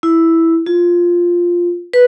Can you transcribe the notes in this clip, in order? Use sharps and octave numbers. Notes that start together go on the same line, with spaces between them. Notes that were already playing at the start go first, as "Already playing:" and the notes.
E4
F4
B4